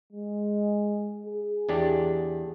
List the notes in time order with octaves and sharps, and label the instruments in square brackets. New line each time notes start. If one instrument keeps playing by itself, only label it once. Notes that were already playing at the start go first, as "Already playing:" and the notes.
[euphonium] G#3
G#4
[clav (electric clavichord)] E2 D4 G4